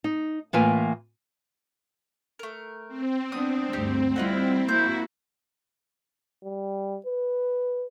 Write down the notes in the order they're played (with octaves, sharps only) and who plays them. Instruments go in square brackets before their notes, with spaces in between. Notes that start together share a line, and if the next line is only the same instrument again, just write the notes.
[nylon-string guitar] D#4
A2 E3 A#3 F4 G#5
[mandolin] A3 A#4
[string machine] C4
[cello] B3 D4 [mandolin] D#6
[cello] D2 G2 [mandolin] D#4 G4
[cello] G3 E4 [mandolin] F4 D#5 F#5
[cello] A#3 E4 [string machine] F#4 [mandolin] C5 G6
[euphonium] G3
B4